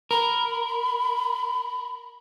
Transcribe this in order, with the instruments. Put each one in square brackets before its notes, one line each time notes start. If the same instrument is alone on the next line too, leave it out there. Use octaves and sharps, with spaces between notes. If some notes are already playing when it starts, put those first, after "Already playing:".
[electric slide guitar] A#4 [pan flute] B5